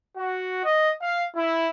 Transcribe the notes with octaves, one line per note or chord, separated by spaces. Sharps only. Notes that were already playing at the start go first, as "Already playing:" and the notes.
F#4
D#5
F5
E4